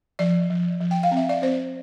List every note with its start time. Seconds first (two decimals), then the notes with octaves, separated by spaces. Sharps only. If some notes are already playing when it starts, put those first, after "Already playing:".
0.19 F3 D5
0.50 F3
0.81 F3
0.91 G5
1.03 F5
1.11 C4
1.17 E5
1.29 D5
1.42 C4 C5